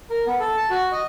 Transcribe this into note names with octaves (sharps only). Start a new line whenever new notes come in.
A#4
B3
A4
A5
F#4
D#5